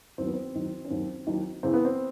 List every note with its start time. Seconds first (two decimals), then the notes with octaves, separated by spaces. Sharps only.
0.18 D#2 D#3 F#3 C4
0.26 B3
0.34 C4
0.55 D#2 D#3 F#3
0.85 C#4
0.90 D#2 D#3 F#3 C4
1.27 D#2 D#3 F#3
1.63 E2 C#3 E3 C4
1.74 B3
1.85 C4